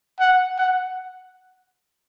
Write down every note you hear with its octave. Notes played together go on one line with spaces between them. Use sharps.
F#5
F#5